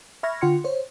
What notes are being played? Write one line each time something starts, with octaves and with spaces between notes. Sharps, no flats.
E5 B5 C#6 F6 G#6 A#6
D3 F4 F#5 G5 C6 C#7
C5 C#5